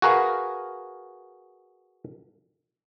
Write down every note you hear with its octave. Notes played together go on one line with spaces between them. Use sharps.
F#4 G#4 A#4 B4 F5